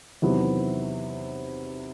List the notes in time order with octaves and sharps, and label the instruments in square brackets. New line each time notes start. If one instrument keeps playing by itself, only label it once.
[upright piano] E2 C3 D#3 F#3 B3